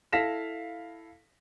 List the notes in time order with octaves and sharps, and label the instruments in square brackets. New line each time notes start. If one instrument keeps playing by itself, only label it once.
[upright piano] E4 A4 F5 A#6 B6 E7